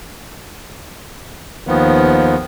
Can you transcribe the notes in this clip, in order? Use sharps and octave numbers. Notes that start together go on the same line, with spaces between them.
D#2 D#3 F3 B3